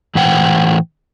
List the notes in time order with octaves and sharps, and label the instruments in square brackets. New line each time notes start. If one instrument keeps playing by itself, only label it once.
[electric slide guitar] A2 E3 C5 F#5 G5